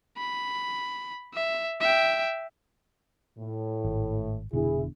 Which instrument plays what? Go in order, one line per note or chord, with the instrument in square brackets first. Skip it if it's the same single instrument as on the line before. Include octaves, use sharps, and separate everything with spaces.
[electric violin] B5
E5
E5 G5
[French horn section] A2
[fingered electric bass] G#1
[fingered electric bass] F1 B2 D3 [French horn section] E4 G#4